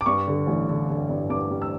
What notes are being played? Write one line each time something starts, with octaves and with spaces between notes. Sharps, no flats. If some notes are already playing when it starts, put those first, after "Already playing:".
D6
G2 C#6
D3
A1
D3
D3
G2
G2 D6
G3
E6